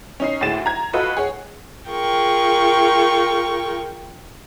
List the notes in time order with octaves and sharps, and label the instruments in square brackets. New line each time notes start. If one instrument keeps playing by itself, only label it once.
[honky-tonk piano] C#4 D#4 C7
D2 A2 G#3 A6 E7
A#5 G#6
F4 F#4 A4 B4 D#5
G#4 C#5 F#5
[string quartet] F4 G#4 A#4 G5 C#6